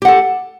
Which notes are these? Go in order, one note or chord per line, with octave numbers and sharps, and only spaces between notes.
G4 A4 F#5